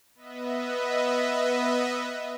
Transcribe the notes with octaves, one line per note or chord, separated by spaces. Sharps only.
B3 B4 D#5 E5